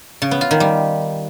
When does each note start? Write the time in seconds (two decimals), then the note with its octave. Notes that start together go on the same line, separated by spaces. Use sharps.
0.22 C#3
0.31 B3
0.41 F4
0.51 D#3
0.60 G3